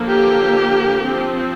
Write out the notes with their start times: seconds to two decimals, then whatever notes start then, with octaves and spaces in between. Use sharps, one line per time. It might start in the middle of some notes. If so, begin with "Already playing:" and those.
Already playing: D3 F3 A#3
0.08 G4
1.06 F3 C4